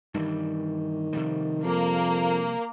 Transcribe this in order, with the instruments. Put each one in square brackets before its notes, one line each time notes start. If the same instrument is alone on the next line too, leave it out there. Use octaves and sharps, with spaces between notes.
[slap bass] G2 E3 G3 [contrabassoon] D#3
[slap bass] C3 F3 G3
[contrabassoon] F2 [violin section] A#3